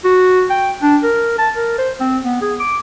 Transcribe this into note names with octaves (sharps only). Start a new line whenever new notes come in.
F#4
G5
D4
A#4
A5
A#4
C5
C4
B3
G#4
D6